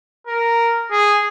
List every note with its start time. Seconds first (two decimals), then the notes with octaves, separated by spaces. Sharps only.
0.27 A#4
0.91 G#4